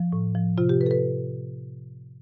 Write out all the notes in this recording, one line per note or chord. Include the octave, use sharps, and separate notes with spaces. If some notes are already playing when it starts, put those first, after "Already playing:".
Already playing: F3
A2
F3
C3 F4
G4
F3 B4
A4
B4